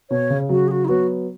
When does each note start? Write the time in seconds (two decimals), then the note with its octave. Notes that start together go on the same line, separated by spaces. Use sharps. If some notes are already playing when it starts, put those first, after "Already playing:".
0.10 B2 C#5
0.30 C#3
0.49 C#3 F#3 F#4
0.67 G#4
0.70 F#4
0.84 D#4
0.87 F#3 B3 F#4